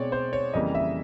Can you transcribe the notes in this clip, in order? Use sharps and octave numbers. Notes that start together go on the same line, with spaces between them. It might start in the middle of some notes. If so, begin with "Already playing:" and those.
Already playing: B2 G#3 C4 C#5 D5
C5
C#5
F2 C#3 E3 G3 A#3 D#5
E5